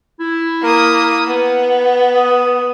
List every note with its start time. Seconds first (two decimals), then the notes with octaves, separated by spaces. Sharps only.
0.20 E4
0.62 A#3 D#6
1.28 B3
2.15 D#6